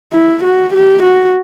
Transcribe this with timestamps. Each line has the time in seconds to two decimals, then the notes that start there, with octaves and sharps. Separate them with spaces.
0.13 E4
0.44 F#4
0.74 G4
1.03 F#4